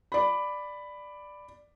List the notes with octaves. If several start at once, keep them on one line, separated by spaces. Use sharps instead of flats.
D5 B5